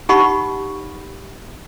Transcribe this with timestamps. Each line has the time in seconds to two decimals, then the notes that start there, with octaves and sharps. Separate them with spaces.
0.09 D#4 G4 F#5 B5 C#6